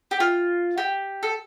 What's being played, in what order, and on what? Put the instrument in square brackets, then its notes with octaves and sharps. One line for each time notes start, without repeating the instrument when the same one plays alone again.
[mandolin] G4
F4
G4
A4